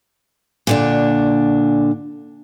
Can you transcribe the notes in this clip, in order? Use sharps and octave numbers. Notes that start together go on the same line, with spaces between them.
A#2 D3 D4